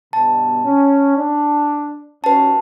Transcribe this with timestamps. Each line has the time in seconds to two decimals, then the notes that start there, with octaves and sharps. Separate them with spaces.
0.13 G2 B2 A5
0.64 C#4
1.16 D4
2.24 D#2 C#4 F#4 B4 A5